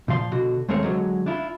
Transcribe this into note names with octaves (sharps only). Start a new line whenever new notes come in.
A#2 F3 F5 C6
B2 D3 F#4
D#2 G#3 A3 C4 A#4 C#5
D3 F#3 G#3
D4 E4 F4